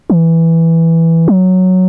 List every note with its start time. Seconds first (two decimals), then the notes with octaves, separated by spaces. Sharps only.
0.10 E3
1.28 F#3